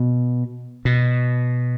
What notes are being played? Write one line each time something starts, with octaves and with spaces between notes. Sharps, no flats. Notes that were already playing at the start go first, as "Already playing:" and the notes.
Already playing: B2
B2